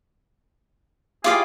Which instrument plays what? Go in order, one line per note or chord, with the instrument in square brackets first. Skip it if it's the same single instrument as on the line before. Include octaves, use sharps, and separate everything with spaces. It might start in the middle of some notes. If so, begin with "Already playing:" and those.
[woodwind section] E4 G4 G#4 [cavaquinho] F4 D5 F5